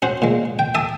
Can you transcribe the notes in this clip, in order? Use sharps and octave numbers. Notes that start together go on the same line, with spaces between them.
C#4 F#4 C5
A#2 G#3
G5
E5 G#5 A5 D#6